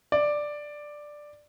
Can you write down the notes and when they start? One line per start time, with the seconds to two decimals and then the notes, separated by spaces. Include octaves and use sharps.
0.12 D5